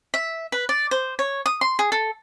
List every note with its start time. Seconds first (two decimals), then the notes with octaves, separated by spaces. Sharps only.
0.14 E5
0.52 B4
0.69 D5
0.91 C5
1.19 C#5
1.46 D#6
1.61 C6
1.79 G#4
1.92 A4